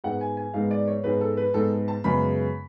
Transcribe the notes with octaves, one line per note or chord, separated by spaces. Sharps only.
G#2 G#3 B3 F#5
G#5
G#5
G#2 G#3 B3 F5
D5
C#5
G#2 G#3 B3 B4
A4
B4
G#2 G#3 B3 A4
A5
F#2 C#3 G#3 B3 B5